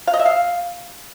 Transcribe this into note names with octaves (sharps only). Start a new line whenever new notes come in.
F5
D#5
E5
F5